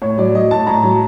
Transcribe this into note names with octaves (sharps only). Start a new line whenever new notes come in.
A2 C#5
F#3 D5
F#3 D#5
A2 A5
A2 A#5
F#3